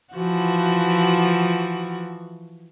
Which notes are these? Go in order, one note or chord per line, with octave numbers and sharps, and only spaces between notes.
E3 F3 F#4